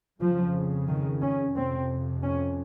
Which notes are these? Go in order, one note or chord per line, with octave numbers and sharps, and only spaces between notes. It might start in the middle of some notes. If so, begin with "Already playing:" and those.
F2 C#3 F3
D#3
C#4
F2 C3 C4
C#4